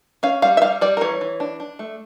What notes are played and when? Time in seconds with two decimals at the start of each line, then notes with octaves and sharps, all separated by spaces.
0.23 C#4 F5
0.42 G3 F5
0.57 E5
0.62 G3 F5
0.81 G3 D5
0.97 A#4
1.01 E3 C#5
1.21 E3
1.40 D4
1.60 D4
1.79 A3